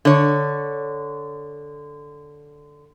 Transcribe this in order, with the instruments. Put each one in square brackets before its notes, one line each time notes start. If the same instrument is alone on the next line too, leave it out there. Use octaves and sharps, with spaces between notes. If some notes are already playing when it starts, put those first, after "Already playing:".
[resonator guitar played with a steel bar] D3 C#5